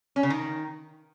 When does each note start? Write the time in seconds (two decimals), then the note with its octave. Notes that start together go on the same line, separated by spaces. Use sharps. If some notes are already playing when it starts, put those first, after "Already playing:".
0.16 C#4
0.23 C#3
0.30 D#3